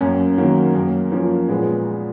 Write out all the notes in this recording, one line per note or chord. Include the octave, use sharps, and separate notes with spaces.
F#2 A#3 C#4
D#3 F#3 A#3
F#2 A#3
F3 A#3 C#4
A#2 G#3 B3